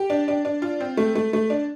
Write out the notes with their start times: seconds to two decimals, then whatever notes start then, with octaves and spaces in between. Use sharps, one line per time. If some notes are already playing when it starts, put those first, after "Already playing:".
Already playing: G4
0.10 D4
0.28 D4
0.45 D4
0.62 F4
0.80 C4
0.97 A3
1.15 A3
1.33 A3
1.50 D4